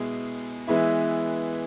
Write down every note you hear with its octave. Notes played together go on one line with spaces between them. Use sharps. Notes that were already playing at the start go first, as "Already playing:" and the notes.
Already playing: B2 G#3 E4 G#4
E3 G#3 B3 E4